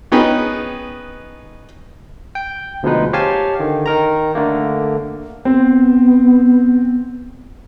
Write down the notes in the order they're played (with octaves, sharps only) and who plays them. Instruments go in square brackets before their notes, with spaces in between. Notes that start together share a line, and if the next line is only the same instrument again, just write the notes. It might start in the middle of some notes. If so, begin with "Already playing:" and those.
[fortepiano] B3 C#4 D#4 G#4 B4 G5
[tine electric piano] G5
D2 B2 F3 G#3 D#4 B4
G4 C5 C#5 F5 G#5 A5
D3 D#3
D#3 A#4 A#5
D3 A3 A#3
[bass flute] B3 [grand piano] C4